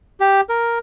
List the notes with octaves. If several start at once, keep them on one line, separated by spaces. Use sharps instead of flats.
G4
A#4